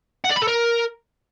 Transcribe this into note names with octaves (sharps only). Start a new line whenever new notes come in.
F#5
D5
B5
A4
A#4